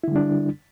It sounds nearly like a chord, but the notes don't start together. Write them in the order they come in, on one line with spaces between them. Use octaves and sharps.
E4 D3 G3 D4